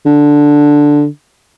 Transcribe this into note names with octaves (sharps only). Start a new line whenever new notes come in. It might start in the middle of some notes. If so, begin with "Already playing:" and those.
D3